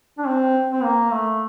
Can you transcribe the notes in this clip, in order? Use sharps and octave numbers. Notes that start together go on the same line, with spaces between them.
D4
C4
C4
A#3
A3